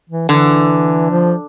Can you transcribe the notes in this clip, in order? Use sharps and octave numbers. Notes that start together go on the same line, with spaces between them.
E3
D3 E3
F3